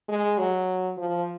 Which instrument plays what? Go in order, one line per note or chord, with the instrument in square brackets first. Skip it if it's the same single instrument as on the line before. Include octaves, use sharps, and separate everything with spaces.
[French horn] G#3
F#3
F3